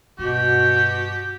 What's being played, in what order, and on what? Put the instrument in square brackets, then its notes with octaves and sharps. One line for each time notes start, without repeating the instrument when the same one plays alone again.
[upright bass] G2 [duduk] B2 [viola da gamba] F#4 [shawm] G4